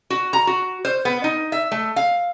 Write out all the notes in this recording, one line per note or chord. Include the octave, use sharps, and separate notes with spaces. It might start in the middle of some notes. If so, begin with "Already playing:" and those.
F#4
A#5
F#4
C5
B3
D#4
E5
A3
F5